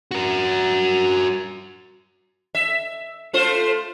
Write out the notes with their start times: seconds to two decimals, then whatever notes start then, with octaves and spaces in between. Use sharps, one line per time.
0.11 F#4 A#4
2.55 E5
3.33 A3 F4 C5